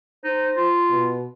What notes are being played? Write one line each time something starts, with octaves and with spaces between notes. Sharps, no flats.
D#4 C5
F4
B2